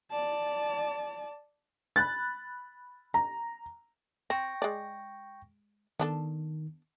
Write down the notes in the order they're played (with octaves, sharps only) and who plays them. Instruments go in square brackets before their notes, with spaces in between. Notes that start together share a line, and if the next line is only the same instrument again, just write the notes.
[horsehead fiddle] D5 A5
[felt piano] B5 F#6 A6
A#5
[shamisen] C4 [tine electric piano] G5 C#6 A#6
[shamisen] G#3 D5
[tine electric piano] D#3 [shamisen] B3 D4 A4